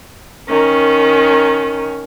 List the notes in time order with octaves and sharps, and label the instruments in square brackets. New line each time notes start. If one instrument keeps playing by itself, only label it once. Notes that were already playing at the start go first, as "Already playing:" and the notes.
[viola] D#3 C#4